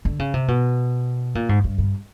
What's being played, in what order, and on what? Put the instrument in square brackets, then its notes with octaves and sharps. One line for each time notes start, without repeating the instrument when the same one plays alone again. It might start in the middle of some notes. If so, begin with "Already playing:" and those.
[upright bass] D3
C#3
C3
B2
A#2
G#2
G2
G2